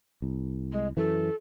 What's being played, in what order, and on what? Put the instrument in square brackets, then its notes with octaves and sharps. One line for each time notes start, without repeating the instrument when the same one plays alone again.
[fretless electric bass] C2
[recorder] G#3
[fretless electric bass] F#2 E3 [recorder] A4